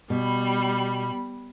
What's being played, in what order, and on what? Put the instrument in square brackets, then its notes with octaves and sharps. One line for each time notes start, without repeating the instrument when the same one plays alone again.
[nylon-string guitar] B2 [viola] G3 B5